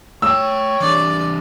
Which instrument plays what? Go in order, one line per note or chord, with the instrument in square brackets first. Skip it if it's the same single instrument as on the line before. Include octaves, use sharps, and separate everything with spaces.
[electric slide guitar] A3 G5 [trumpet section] C#5 [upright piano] E6
[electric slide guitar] E3 D4 G4 [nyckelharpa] D5